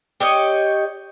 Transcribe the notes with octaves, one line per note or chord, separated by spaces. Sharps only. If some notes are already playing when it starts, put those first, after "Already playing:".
G4 C#5 D#5